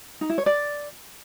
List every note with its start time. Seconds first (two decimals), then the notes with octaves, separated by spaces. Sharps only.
0.21 D#4
0.30 E4
0.38 C#5
0.46 D5